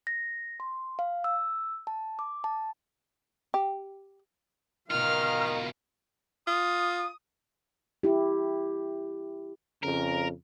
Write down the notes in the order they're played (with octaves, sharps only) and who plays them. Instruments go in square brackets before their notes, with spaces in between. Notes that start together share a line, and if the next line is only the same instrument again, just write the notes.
[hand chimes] A#6
C6
F5
E6
A5
D6
A5
[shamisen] G4
[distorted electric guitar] B2 F4 [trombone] D#3 [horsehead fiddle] A#4 F5 [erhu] F6
[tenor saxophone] F4 [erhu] D#6
[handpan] E4 G4
[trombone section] F2 C#3 [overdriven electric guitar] A#4